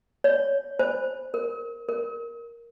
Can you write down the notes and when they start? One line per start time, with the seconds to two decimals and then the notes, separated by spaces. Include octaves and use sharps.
0.24 C#5
0.79 C5
1.34 A#4
1.89 A#4